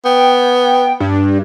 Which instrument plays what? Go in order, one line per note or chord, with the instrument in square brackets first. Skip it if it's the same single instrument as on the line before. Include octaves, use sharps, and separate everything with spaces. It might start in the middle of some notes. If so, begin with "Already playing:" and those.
[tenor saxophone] B3 [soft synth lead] G5
[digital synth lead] G2